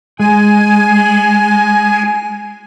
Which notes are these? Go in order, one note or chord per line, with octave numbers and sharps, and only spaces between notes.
G#3 G#5